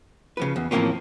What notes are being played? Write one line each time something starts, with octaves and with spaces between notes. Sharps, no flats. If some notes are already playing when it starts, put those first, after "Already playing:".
C#3 F3 B4
E2
A2 E3 F3 A#3 C4 C#4